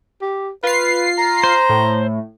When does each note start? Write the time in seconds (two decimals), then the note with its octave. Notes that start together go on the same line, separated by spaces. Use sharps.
0.22 G4
0.63 F4 B4 C7
1.18 A#5
1.43 C5
1.69 A2